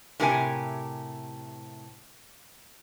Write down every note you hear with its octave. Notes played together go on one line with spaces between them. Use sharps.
A2 C3 G4 A#4 C#5 G#5